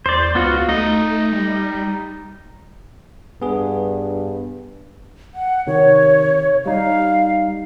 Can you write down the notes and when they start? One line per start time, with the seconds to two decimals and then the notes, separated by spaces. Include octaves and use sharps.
0.06 E2 C5 D5
0.35 C#2 B3 F4 F#4
0.69 A3 D#4 D#5
1.32 G3
3.42 G2 B3 G#4
5.35 F#5
5.67 C3 D#3 C#5
6.66 G3 D#4 F5